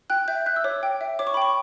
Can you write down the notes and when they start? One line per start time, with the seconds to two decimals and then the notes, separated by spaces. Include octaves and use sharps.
0.10 G5 F#6
0.28 E5 G6
0.46 E5 F#6
0.56 E6
0.64 C#5 D6
0.83 G5
1.01 E5
1.19 C#5 D6
1.27 C#6
1.34 B5
1.37 G5 C#6